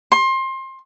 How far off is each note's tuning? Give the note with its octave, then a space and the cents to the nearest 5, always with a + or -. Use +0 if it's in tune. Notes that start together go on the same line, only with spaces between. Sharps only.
C6 +25